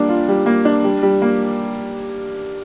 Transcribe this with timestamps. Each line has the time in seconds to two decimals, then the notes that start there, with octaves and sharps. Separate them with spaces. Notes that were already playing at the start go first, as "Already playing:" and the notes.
Already playing: G3 A#3 D4
0.09 F4
0.28 G3
0.46 A#3
0.65 D4
0.84 G3
1.03 G3
1.22 A#3